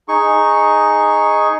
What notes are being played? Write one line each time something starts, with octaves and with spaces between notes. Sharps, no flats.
D#4 G#4 C#6